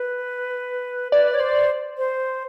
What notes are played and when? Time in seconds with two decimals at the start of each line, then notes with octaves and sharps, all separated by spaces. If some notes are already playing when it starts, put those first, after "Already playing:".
Already playing: B4
1.12 B4 D5
1.34 C#5
1.40 C5
1.98 C5